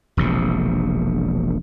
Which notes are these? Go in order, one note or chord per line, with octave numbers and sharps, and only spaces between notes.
E1 A#1 C3